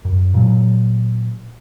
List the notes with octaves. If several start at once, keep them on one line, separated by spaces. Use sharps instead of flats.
F#2
A#2 F#3